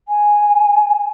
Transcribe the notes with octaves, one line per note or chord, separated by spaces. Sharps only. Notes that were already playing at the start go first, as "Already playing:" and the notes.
G#5